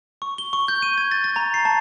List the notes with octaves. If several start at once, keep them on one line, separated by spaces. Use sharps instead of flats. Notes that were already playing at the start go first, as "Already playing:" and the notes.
C#6
G7
C#6
G6
D#7
G#6
A6
A6
A#5
C7
A5